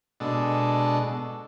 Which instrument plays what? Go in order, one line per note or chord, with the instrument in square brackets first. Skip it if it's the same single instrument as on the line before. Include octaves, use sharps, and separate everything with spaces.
[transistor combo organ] B2 G#3 D4 A4